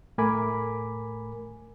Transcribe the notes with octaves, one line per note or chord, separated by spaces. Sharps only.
A2 A3 A#4 G#5 B5 D6